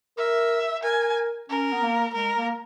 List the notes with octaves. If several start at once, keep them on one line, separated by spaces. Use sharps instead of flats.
A#4 E5
A#4 G#5
C#4 A#4
B3
A#3
G#3 A#4
A#3